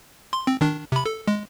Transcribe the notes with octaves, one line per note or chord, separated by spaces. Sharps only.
C6
C4
D#3 D4
C3 B5
A4
G#3